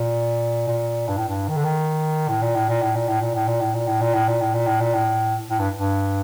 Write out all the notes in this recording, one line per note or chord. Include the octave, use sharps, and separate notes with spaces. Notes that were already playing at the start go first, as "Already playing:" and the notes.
Already playing: A#2
A#2
G2
A2
G2
D#3
D3
D#3
A2
A#2
A2
A#2
A2
A#2
A2
A#2
A2
A#2
A2
A#2
A2
A#2
A2
A#2
A2
A#2
A2
A#2
A2
A2
G2
G2